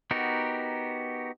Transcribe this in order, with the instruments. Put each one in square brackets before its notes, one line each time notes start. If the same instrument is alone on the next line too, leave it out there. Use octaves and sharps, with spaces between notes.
[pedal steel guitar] B3 D#4 F#4 G4 A#4